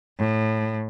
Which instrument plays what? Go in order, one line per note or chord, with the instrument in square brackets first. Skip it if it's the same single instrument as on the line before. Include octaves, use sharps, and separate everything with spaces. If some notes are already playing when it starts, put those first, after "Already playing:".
[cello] A2